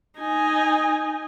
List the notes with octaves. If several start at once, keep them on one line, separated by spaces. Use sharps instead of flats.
D#4 G#5